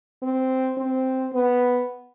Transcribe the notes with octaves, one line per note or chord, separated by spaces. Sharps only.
C4
C4
B3